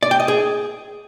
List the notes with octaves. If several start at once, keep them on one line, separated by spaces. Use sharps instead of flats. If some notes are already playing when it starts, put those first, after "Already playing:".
D5
G5
D#5
G#4